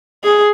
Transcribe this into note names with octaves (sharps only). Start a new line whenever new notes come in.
G#4